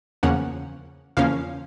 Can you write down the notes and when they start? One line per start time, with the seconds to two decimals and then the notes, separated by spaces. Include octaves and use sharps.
0.23 E2 C#3 F3 A#3 C#4 F#5
1.17 E2 C#3 F3 A#3 C#4 F5